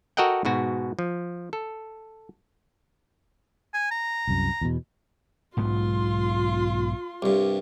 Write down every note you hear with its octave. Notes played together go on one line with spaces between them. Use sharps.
F#4 A4 A#4 D#5 F#5 G5
G#2 B2 F#4
F3
A4
G#5
A#5
C2 F#2
E2 B2
B1 G#2 B3 F4 C6
C2 G2